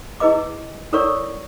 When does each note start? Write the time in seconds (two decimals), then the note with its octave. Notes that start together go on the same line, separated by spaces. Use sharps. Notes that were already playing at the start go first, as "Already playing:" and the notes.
0.20 E4 G#4 B4 D#5 D6
0.92 E4 A4 A#4 C#5 D5 C#6